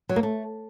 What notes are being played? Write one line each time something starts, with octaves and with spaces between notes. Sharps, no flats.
F#3
A#3
A3